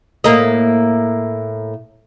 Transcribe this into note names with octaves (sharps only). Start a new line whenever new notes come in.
A2 A#3 D#5